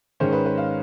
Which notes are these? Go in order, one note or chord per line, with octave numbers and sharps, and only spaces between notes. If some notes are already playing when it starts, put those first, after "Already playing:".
G#2 D#3 G#3 C#4 C5
B4
B4
F5